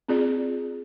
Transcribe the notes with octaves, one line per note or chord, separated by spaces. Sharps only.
C4 F4 G#4 D5